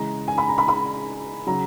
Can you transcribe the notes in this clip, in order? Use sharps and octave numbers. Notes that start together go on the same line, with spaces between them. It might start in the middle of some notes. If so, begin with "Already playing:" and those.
Already playing: C#3 E3 G#3 A#5
G#5
B5
A#5
B5
B5
C#3 F#3 A#5